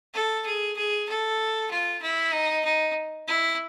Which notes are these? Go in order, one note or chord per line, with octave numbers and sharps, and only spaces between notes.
A4
G#4
G#4
A4
F4
E4
D#4
D#4
E4